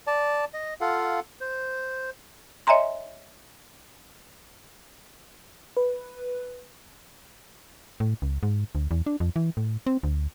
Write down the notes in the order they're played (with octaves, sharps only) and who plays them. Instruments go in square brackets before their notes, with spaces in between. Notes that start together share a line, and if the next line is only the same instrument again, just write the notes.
[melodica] D5 A5
D#5
F4 A4 F5 F#5
C5
[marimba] C#5 D#5 E5 G#5 A#5 C6
[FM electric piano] B4
[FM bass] A2
C#2
G#2
D2
E2
D4
F2
E3
A2
C4
D2